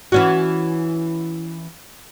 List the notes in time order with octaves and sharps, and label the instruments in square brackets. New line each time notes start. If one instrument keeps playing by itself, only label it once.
[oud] E3 C#4 F#4